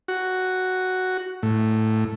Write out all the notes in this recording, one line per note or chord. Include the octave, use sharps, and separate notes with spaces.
F#4
A2